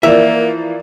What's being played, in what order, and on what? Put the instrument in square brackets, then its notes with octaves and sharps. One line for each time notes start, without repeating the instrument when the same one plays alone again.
[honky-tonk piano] E3 F3 [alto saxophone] A#3 [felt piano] A#4 D5 [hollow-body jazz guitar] E5